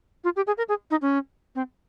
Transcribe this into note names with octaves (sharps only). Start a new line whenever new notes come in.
F4
G4
G#4
A#4
G#4
D#4
C#4
C4